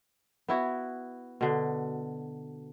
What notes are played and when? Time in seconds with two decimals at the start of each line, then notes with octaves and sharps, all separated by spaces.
0.48 B3 E4 F#4
1.41 B2 D3